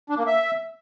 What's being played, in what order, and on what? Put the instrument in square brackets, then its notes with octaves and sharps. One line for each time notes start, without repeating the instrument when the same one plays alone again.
[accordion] D4
A#3
E5